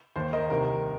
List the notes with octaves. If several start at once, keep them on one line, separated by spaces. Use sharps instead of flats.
D#2 D#3 C5
A#4 D#5
C2 C3 D#3 A#4